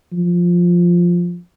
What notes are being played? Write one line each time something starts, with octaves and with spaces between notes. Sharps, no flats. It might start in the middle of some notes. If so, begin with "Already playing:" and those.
F3